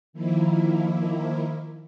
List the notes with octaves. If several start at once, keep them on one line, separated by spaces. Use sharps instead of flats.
D#3 F3 A#3 E4